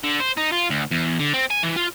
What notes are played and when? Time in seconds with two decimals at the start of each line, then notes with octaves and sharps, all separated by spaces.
0.04 D3
0.20 C5
0.37 D#4
0.52 F4
0.70 D2
0.91 E2
1.19 D3
1.34 C4
1.51 G#5
1.63 E3
1.77 F4